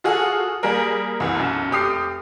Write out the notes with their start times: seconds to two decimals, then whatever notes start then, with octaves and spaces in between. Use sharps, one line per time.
0.04 F4 F#4 G#4 A4
0.63 G3 A#3 G#4 A#4
1.20 C2 E3
1.36 B1 F#2
1.71 F1 G4 D#6 C7